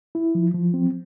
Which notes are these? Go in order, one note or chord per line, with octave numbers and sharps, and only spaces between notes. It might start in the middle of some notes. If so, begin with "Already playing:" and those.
E4
F3
F3
C4